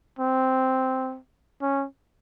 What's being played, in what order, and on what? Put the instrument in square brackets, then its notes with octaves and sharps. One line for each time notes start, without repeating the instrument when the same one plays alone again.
[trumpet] C4
C#4